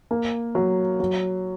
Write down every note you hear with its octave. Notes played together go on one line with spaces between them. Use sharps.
A#3
F#3
F#3